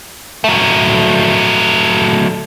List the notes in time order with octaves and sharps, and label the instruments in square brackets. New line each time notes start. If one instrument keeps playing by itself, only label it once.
[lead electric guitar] F#3 A3